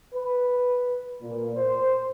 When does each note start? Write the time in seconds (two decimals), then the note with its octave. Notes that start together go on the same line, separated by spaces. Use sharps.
0.13 B4
1.22 A#2
1.56 C5